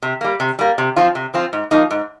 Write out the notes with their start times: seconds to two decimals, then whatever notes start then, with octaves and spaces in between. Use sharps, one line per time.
0.02 C3
0.21 G3 A#3
0.40 C3
0.59 G3 A#3
0.78 C3
0.96 F3 C4 F4
1.15 C3
1.34 F3 C4 F4
1.53 G#2
1.71 F3 A#3 D#4
1.91 G#2